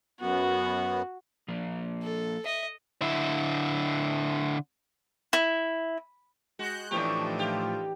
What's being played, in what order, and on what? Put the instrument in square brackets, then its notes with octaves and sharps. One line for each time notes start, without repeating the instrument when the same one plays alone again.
[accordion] F#2 B3 [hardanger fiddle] F#4
[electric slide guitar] F3 A#3
[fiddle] A4
[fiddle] D#5 [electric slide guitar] E5
[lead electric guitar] D3 E4
[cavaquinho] E4
[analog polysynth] G#3 F#6 G6 [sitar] F#4
[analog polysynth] A2 F3 A3 [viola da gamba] E3 D4 D#4 [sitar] G4 [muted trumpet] C#6
[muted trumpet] F4 [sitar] G4